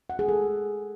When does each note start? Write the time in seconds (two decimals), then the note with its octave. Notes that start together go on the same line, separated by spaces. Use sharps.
0.10 F#5
0.19 G#4
0.29 A4